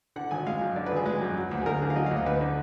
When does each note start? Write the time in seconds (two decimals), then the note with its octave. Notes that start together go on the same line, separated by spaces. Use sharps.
0.16 D3 F#5
0.31 G#1 G#5
0.46 G#3 F5
0.61 F#2
0.76 D3 D5
0.86 B4
0.91 G#1
0.96 G#4
1.06 G#3 B4
1.22 F#2
1.37 F#3
1.51 D2
1.62 G#4
1.66 D2 A#4
1.81 D3 G#4
1.90 F5
1.96 F#3 D#5
2.06 F5
2.11 D2 D#5
2.26 D2 B4
2.41 D3